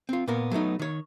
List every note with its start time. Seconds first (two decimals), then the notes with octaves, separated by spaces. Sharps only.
0.09 C4 F4
0.28 A#2 B3 A#4
0.51 F#3 A3 B3 D#4
0.79 D#3 C#5